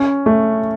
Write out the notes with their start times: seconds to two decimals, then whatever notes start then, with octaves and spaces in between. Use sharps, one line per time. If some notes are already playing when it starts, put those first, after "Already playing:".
Already playing: C#4
0.26 A3